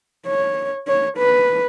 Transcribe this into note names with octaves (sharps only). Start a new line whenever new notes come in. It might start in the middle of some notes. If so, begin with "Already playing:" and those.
C#5
C#5
B4